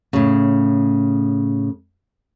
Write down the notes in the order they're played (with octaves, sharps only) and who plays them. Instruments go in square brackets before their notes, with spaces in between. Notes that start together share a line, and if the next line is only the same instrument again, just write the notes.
[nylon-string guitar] A2 C#3